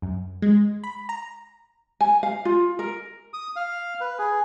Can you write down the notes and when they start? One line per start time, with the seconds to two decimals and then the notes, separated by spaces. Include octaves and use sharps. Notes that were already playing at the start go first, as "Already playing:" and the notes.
0.02 F#2
0.42 G#3
0.84 B5
1.09 A#5
2.01 G#5
2.23 F5
2.45 F4
2.79 A#4
3.34 D#6
3.56 F5
4.01 B4
4.19 G#4